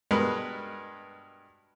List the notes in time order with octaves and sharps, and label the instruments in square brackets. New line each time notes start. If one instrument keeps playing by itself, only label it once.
[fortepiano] G2 B2 G#3 A#4 B4